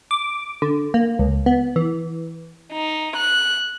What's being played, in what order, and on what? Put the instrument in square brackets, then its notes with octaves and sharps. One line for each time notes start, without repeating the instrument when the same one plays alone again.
[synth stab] D6
D3
A#3
C#2
B3
E3
[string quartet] D#4
F#6